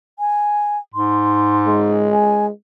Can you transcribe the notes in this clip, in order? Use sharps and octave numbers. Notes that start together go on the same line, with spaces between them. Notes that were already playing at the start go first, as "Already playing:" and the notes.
G#5
G#2 C6
G#3
G#5